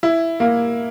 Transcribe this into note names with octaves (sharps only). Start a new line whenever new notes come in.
E4
A#3